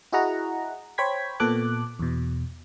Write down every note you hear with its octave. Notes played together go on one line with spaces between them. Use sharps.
E4 F#4 G#4 D#5 F#5 A#5
C5 C#5 G5 B5 G#6 B6
A#2 B3 A4 D6 F#6
E2 B2